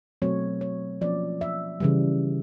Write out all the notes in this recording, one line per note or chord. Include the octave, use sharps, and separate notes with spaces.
B2 F#3 A3 C4 C#5
C#5
F3 A#3 C#4 D5
E5
C#3 E3 G3